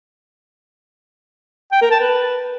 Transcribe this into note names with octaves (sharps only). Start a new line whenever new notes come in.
G5
A#4
A5
B4